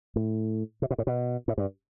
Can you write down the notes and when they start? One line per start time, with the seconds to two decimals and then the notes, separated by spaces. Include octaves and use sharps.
0.16 A2
0.82 C3
0.91 B2
0.98 A2
1.07 B2
1.48 A2
1.58 G2